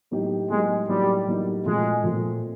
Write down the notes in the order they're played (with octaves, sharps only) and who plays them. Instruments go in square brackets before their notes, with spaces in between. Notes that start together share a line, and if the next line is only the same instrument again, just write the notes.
[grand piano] A2 F#3 A#3 D#4 G4
[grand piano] A2 F#3 A#3 D#4 G4 [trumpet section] G#3
[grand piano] A2 F#3 A#3 D#4 G4 [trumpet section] G3
[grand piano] A2 F#3 A#3 D#4 G4
[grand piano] A#2 F3 A3 C4 F4 [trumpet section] G#3
[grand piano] A#2 F3 A3 C4 F4